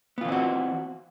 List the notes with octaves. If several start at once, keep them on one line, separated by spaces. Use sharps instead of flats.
E3 B3 C4 F4 F#4